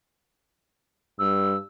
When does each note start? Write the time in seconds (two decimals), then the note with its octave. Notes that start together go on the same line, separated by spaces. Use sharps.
1.19 G2 E6